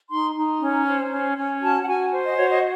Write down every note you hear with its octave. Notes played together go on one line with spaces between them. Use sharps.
D#4 C6
D#4
C#4
C5
C#4
C#4
F#4 A5
F#5
F#4 G#5
C5
D#5
F#4 C#5
D#5